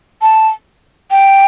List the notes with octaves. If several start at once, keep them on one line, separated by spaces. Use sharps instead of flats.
A5
G5